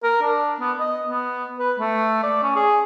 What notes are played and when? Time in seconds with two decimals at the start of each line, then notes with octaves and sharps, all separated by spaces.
0.03 A#4
0.22 D4
0.60 B3
0.80 D#5
1.08 B3
1.59 B4
1.79 A3
2.23 D5
2.43 C#4
2.56 G#4